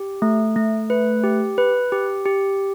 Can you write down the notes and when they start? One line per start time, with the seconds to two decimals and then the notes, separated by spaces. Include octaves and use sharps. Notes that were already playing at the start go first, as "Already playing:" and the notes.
Already playing: G4
0.22 A3
0.56 A3
0.90 B4
1.24 G4
1.58 B4
1.92 G4
2.26 G4